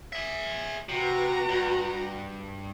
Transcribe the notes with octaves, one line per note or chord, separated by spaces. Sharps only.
G#4 E5
C3 F#4 B4 A#5
G2